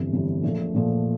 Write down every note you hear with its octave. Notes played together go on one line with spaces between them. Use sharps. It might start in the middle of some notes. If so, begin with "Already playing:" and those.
Already playing: G1 F2 E3 G3
G1 F2 E3 G3
A#1 A#2 F3 A3
A#1 A#2 F3 A3